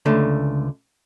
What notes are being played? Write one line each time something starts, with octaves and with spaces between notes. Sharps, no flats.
C#2 D3 A3